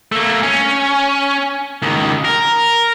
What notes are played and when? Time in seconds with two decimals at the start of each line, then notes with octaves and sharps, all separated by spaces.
0.12 A3 A#3
0.43 C#4
1.82 C#2 D#3
2.25 A#4